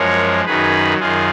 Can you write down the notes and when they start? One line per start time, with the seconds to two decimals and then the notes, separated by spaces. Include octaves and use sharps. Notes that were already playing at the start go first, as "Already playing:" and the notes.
Already playing: F#2 F3 G#3 A#4 C#5
0.45 F#2 D#3 F#3 G#4 B4
0.99 F#2 D#3 F4 G#4